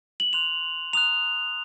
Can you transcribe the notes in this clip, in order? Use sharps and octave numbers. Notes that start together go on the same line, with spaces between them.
F#7
C6 F#6 F7
A#5 D#6 F#6 F7